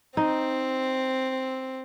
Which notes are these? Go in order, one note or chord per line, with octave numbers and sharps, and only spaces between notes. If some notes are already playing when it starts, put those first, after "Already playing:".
C4 D#4